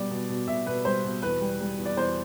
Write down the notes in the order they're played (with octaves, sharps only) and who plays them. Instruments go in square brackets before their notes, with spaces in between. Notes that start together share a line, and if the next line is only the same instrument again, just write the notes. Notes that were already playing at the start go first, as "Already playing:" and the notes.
Already playing: [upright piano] B2 G3 D5
B2
B2
B2 E5
B2 B4
G3 C5
B2
E2 B4
G3
G3
E2
D5
E2 C5